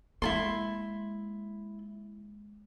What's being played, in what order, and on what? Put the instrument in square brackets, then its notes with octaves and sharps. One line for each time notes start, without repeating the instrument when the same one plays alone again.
[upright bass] G#3 A#3 [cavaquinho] E4 A4 C6